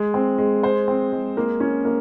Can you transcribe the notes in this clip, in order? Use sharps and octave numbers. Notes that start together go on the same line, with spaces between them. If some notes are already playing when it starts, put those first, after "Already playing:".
Already playing: G#3
C4
G#3
C5
C4
G#3
A#3
C#4
A#3